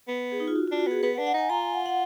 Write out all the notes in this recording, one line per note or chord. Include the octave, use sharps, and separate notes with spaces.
B3
G#4
D#4
F4
F#4
D4 F4
F#4
B3 G#4
B3 B4
F#5
D4
F#5
D#4 G#5
F4 A#5
G#5
F#5
F#5